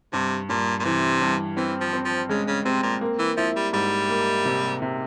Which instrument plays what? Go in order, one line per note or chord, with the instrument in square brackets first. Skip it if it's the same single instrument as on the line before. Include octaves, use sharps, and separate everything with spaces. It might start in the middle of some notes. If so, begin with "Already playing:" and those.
[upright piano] G2 [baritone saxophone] C3
[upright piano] G2 [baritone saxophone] A#2
[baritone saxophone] A#2
[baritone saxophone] C3 [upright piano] E3
[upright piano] G2
[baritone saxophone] E3 [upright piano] C4
[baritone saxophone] F3
[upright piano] C4
[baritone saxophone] F3
[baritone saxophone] C#3 [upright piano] G#3
[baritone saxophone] C#3
[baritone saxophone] C3 [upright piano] C4
[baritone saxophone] A#2
[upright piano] A#3
[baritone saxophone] E3
[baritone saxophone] F3 [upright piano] E4
[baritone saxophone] G3
[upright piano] G#2 [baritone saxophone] G3
[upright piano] A#3
C3
C3